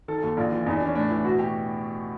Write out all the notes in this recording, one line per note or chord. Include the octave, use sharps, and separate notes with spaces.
D#3 A4
A4
D#2
A#1 F4
E3 F4
E2 D#4
D4
E3 C#4
A2 D4
E3
B2 F#4
B2 G4